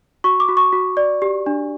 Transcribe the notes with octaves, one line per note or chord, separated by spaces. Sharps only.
F#4 C#6
D6
F#4
C#6
F#4
D5
G4
D4